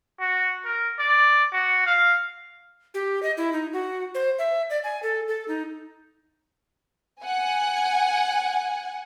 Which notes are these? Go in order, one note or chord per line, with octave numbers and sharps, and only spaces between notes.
F#4
A#4
D5
F#4
F5
G4
D#5
E4
D#4
F#4
C5
E5
D5
G#5
A4
A4
D#4
F#5 G#5